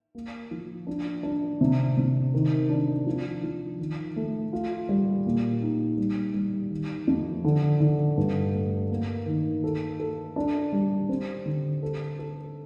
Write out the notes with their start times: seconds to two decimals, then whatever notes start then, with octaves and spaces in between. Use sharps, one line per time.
0.15 A#3
0.51 F3
0.87 D4
1.23 D4
1.61 C3
1.97 C3
2.34 D#3
2.69 D4
3.06 F3
3.43 F3
3.79 D#3
4.16 A3
4.53 F4
4.89 G3
5.26 A#2
5.62 D#4
5.98 G3
6.34 G3
6.71 D#3
7.07 F2
7.44 D3
7.80 D3
8.17 G2
8.54 A3
8.91 A#3
9.26 D#3
9.64 A4
9.99 A4
10.36 D4
10.72 G3
11.09 C4
11.45 D3
11.83 A4
12.19 A4